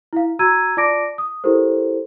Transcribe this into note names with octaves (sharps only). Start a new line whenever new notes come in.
E4 F5
F#4 A#5 E6 G#6 D#7
F4 D5 A5 D6 A#6 D7
D#6
E4 G4 A4 A#4 C5